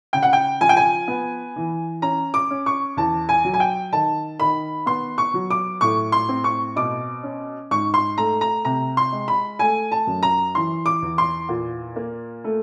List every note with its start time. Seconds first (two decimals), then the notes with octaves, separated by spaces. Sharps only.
0.13 C#3 G5
0.23 F#5
0.33 G5
0.61 F3 G#5
0.69 G5
0.77 G#5
1.08 B3
1.56 E3
2.02 C#4 A#5
2.34 D6
2.51 C#4
2.66 C#6
2.97 E2 A5
3.29 G#5
3.45 F#3
3.54 G#5
3.60 G5
3.92 D#3 A5
4.40 D#3 B5
4.86 B3 C6
5.18 C#6
5.34 F#3
5.50 D6
5.81 A2 C#6
6.12 C6
6.29 C4
6.44 C#6
6.76 B2 D6
7.23 C#4
7.71 G#2 C#6
7.94 C6
8.17 A3 A#5
8.41 A#5
8.65 C3 A#5
8.97 C6
9.12 G#3
9.28 B5
9.59 A3 G#5
9.92 A5
10.07 F#2
10.23 A#5
10.55 E3 C6
10.86 D6
11.02 E2
11.18 C6
11.49 A#2
11.96 A#3
12.44 A3